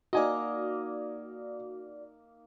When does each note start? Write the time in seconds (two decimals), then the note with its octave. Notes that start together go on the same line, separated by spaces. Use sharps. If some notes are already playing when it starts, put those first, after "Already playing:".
0.13 A#3 D#4 F#4 D5 D#5 G#5